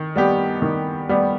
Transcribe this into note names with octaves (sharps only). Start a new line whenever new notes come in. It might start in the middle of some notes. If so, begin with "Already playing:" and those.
Already playing: D#3
G3 B3 G4
D#3
G3 B3 G4